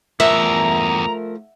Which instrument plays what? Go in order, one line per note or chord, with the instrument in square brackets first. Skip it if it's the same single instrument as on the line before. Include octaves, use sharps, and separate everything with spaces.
[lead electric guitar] E2 G2 [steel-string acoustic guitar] F3 A3 A#4 [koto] E5 F#5 [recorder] A#5